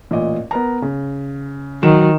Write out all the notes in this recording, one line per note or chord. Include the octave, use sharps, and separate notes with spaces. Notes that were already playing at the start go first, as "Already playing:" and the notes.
A1 A#2 D#5
B3 A#4 A#5
C#3
D#3 F#3 E7